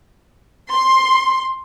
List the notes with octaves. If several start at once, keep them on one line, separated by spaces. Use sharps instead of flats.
C6